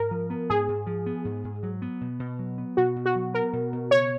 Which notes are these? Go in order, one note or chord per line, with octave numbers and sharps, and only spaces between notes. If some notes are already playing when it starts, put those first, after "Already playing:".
Already playing: G#2 A#4
F3
B3
G#2 G#4
G#2
F3
B3
G#2
G#2
F#3
B3
B2
B2
F#3
B3
B2 F#4
B2
F#4
F#3
B3 A#4
B2
B2
C#3 C#5